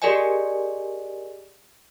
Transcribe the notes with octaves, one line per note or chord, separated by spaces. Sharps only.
G4 G#4 A#4 D5 D#5 G#5